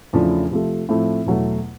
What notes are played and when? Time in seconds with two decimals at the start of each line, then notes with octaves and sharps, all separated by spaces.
0.13 E2 C#3 F3 A3 D4
0.50 C3 F3 A3
0.89 A2 F3 A3 C4
1.26 E2 B2 F#3 A3